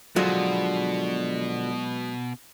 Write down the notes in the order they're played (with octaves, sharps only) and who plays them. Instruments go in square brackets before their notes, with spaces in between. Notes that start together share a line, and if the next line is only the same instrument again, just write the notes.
[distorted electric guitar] B2 [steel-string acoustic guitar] D3 F3 F#4 [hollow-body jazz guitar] F#3 G#3